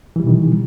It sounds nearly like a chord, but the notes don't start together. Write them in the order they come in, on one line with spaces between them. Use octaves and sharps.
E3 G3 B2 D#3